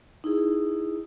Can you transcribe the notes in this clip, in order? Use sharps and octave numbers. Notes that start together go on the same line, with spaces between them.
D#4 E4 G#4